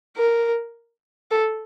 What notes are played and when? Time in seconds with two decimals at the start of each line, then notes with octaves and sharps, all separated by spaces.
0.16 A#4
1.31 A4